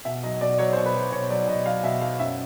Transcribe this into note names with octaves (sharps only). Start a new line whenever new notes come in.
B2 E5
F#3 D#5
B2 D5
F#3 C#5
C5
B2
B4
F#3 C5
B2 C#5
F#3 D5
B2 D#5
F#3 F5
B2 E5
F#3 F5
F#2 E5